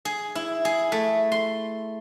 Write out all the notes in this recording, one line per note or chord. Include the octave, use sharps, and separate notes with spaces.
G#4
E4
G#4
A3
C6